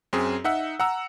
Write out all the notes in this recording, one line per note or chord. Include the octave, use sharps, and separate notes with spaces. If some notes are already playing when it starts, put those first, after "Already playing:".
F#2 C4 G#4
D#4 E5 F#5 E6
F#5 A#5 E6